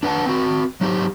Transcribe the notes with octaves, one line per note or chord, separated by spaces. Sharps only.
D4 B4 F5 F#5 A5
C4 F#4
F#3 D#4 G4 C5